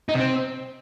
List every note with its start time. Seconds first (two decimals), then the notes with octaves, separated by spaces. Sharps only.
0.09 D#4
0.14 C3
0.19 C4